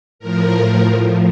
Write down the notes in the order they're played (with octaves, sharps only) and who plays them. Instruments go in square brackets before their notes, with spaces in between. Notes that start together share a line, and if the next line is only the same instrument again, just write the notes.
[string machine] A2 F3 A#4